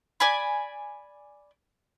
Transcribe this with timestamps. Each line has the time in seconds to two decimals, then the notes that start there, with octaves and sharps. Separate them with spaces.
0.20 D5 G#5 B5